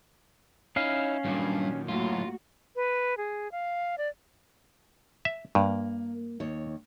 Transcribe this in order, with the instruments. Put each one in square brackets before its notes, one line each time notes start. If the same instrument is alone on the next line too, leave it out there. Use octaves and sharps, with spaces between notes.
[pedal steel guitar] C#4 F5 [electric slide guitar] D#4 E4 D#5 [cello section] C#5
[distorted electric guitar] G2 [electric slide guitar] A#2 D#3 F#3
[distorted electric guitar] F#2 A2 [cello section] A3 A#3 F#4 [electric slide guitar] F4
[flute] B4
G#4
F5
D5
[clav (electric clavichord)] E5
[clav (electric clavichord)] G2 [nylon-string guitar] A#3
[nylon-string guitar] D#2 C#5